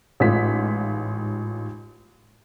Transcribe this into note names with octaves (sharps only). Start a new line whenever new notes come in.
A1 G#2 F4 B6